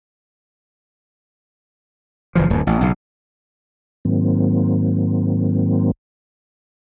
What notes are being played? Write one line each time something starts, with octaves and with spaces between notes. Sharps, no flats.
F#1 E3 F3
D1 G2
A1
B1 C#3
G#2 D#3 F#3 A#3 C4